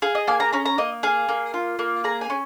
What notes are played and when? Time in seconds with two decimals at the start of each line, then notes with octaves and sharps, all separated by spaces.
0.02 G#4 F5
0.15 D#5
0.28 A#3 G#5
0.40 A#5
0.52 C#4 A#5
0.66 A#5
0.78 A#3 D#5
1.03 G#4 F5
1.29 A#3
1.54 F4
1.79 A#3
2.04 G#4 A#5
2.21 G#5
2.30 C#4